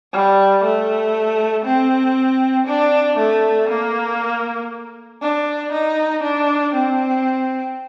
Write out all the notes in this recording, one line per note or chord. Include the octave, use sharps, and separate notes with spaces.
G3
A3
C4
D4
A3
A#3
D4
D#4
D4
C4